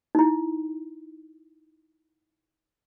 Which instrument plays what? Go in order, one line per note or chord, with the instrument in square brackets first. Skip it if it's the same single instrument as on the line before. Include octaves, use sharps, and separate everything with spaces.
[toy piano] D#4 E4